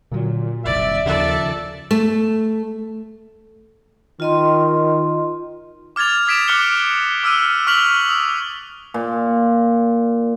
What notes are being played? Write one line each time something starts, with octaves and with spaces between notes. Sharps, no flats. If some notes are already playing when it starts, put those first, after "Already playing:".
A#2 D3 F#3
F#1 C2 D#3 D5 E5
D#2 C#3 F3 A4 D5
A3
D#3 F4 D#5 C6
D6 F6 G#6 A6 F7
D#6 G#6 B6 D7 E7
D6 F6 F#6 C#7 G7
D6 E6 F6 D#7
C#6 E6 F6 B6 F7 F#7
D#6
A#2